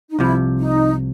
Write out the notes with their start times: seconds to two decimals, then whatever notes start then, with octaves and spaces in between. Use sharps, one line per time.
0.10 D#4
0.19 C2 C3 F3 E4
0.58 D#4